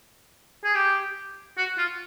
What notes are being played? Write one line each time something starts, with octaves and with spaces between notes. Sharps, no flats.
G#4
G4
F#4
F4